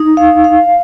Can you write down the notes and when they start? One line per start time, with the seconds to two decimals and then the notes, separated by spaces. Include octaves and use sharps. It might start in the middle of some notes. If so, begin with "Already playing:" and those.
Already playing: D#4
0.17 F5
0.44 F5